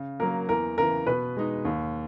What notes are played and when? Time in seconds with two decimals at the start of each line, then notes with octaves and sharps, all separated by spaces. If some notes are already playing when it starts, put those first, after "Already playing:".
Already playing: C#3
0.20 F#3 A#3 A#4
0.49 E2 A#4
0.78 C#3 E3 A#4
1.07 B2 B4
1.37 G#3 D#4
1.65 D#2